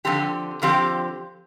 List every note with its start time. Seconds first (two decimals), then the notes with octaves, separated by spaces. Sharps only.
0.05 D3 F3 C4 G4
0.62 D3 F3 C4 G4